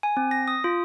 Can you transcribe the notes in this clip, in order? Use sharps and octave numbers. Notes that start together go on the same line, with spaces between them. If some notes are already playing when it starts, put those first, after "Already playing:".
G#5
C4
A#6
D#6
F4